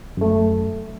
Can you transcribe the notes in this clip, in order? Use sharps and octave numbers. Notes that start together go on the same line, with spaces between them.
F#2 A3